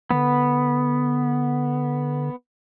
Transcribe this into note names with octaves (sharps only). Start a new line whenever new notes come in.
D3 B3